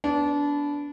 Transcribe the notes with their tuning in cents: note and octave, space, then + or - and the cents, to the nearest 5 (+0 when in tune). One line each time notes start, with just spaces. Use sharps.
B3 +0 D4 -25